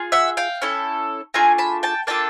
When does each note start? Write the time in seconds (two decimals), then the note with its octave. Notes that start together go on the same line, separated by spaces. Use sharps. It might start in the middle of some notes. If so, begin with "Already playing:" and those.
Already playing: F4 G#4
0.12 E5 F#5
0.37 F5 G5
0.62 C#4 E4 A4
1.34 A3 D4 F4 G#4 G#5 A#5
1.58 A5 B5
1.83 G5 A5
2.07 A#3 D4 F4 A4 G5 A5